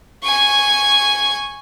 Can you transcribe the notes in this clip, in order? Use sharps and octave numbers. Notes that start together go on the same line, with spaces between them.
G#5 C#6